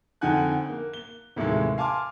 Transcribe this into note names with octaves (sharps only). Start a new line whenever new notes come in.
F2 D3 D#4 F#5 G#5 F#6
A#3
G7
D#2 A2 C3 E3 G#3
F5 G#5 A5 C6 D6 F6